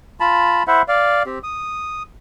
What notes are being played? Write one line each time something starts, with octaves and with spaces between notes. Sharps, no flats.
F4 A5 B5
E4 C5 E5 F#5
D5 F5
C4 G4
D#6